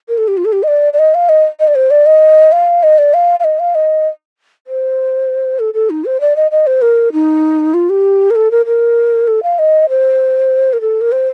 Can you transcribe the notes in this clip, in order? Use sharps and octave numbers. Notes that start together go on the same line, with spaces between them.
A#4
A4
G4
F4
A4
G4
D#5
D5
D5
D#5
F5
D#5
D#5
D5
C5
D5
D#5
F5
D#5
D5
F5
F5
D#5
F5
D#5
C5
A4
A4
D#4
C5
D5
D#5
D#5
C5
A#4
D#4
F4
G4
A#4
A4
A#4
A#4
A4
F5
D#5
C5
A#4
A4
A#4
C5